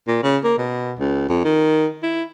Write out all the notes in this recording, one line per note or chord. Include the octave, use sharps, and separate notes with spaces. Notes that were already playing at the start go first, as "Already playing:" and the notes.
A#2
C#3
A#3
B2
C#2
F2
D#3
E4